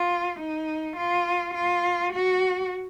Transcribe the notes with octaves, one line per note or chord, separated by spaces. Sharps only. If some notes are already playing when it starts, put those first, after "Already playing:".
Already playing: F4
D#4
F4
F4
F#4